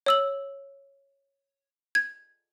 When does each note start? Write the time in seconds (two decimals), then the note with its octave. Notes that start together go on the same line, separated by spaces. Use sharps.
0.06 C#5 E6 F#7
1.95 G#6